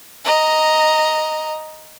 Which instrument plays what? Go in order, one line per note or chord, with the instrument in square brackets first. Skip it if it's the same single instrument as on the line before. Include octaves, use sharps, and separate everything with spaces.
[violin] D#5 A#5